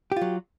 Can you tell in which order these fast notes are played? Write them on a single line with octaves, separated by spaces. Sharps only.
G4 F4 F#3